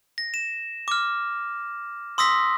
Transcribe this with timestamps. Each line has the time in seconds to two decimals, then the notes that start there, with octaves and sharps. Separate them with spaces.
0.18 A#6
0.34 E7
0.88 D6 F6
2.18 C6 D#6 E6 A#6 B6